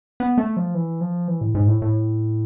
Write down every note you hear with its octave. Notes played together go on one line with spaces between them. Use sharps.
B3
A3
F3
E3
F3
E3
A2
G#2
A2
A2